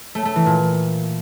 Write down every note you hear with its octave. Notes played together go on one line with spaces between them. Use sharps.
A3
A3
E3
A#2